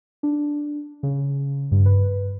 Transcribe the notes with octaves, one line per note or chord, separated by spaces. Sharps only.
D4
C#3
G2
B4